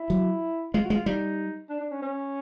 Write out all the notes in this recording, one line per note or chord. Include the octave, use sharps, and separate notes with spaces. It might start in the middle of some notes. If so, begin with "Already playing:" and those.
Already playing: E4
F#3
G#3 F4
F#4
G#3
F4
G3 D#4
D4
D4
C#4
C#4